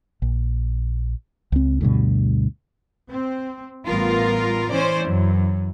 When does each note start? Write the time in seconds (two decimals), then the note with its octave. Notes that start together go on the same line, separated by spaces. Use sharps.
0.22 A#1
1.52 C#2 C4
1.81 D2 G2 B2
3.09 C4
3.86 A1 G3 B3 F4 A#4
4.70 E3 C#4 C5 D5
5.06 F#2